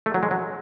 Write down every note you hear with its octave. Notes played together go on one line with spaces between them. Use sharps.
A3
F#3
G#3
F#3